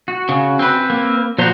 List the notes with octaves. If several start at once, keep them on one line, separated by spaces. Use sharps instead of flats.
F#4
C#3
C4 B4
A#3
A#2 F3 F#4 C5 A#5